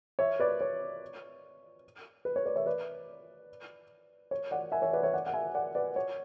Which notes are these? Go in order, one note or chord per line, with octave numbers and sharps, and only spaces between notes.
C#5 E5
B4 D5
C#5
B4
C#5
B4 D5
C#5 E5
B4 D5
C#5
D5 F#5
E5 G#5
C#5 E5
B4 D5
C#5 E5
D5 F#5
F#5
E5 G#5
D5 F#5
B4 D5
C#5